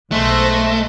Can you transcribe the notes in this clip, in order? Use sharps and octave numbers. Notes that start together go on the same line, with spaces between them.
B1 G#3 A3 C5 A5 F#6 A#6